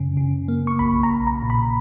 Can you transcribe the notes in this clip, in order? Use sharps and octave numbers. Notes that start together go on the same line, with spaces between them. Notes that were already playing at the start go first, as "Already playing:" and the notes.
Already playing: F#2 C#3
C#3
A#3
C#6
B1 B5
A#5
B1
A#5
A#2
B5